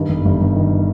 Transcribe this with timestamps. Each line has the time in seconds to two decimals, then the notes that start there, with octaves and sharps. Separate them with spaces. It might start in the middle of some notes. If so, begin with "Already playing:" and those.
Already playing: G2 D#3
0.09 G1
0.25 G1
0.41 G2
0.56 D#3